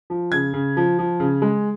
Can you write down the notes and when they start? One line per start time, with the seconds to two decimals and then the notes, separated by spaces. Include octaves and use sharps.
0.10 F3
0.32 C#3 G#6
0.54 C#3
0.77 F3
0.99 F3
1.20 C#3
1.42 G#3